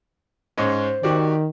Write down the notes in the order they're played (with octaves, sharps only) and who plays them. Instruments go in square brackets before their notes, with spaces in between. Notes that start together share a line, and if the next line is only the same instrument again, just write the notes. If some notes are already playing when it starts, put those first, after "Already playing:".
[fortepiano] G#2 G#3 C#4 [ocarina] C5
[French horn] D#3 [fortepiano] F#4 G4 D5